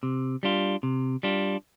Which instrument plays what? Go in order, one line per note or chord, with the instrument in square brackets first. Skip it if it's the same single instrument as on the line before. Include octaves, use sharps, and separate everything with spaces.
[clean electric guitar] C3
G3 D4 F4
C3
G3 D4 F4